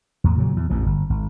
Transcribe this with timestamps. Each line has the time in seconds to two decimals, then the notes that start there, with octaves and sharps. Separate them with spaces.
0.24 E2 A2
0.37 A#2 C#3 F#3
0.56 E2
0.70 A1 F2 B2
0.86 G1
1.10 G#1